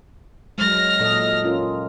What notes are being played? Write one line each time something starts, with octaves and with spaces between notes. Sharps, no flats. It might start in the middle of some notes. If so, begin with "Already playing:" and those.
F#3 G#3 F6 A#6
A#2 A4 D#5
C#4 F4 A#4